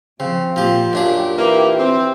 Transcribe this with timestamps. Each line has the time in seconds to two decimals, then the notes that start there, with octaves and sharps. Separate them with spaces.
0.20 C#3 F3 C4
0.56 A#2 F3 G4
0.93 F#2 A#2 D4 G4 G#4
1.38 E3 A#3
1.78 C4